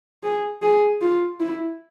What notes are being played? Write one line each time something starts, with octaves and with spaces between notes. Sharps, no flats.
G#4
G#4
F4
E4